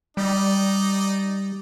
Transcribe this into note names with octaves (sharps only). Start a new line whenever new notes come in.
G3 D#4 D5